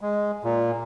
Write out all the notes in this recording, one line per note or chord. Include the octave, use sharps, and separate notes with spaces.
G#3
A#2